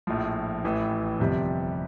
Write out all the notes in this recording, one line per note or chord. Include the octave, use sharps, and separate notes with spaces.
A#1 A2 F3
A1 A2 E3
G1 F2 C3 G3